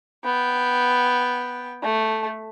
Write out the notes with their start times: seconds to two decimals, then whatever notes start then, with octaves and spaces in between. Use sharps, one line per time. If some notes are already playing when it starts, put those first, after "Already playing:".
0.24 B3 G5
1.83 A3